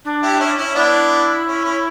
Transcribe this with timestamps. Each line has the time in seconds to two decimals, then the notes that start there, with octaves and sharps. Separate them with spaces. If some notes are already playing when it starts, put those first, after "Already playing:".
0.04 D4
0.22 E4 G4
0.40 C#4 E4
0.57 C#4 E4
0.75 B3 D4 E4
1.47 C#4
1.64 C#4